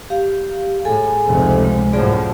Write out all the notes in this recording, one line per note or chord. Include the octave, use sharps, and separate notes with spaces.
G4 F5
A2 G#4 A4 G#5
F1 C#2 C3
G#3
F#2 A2 F3 G#4 D5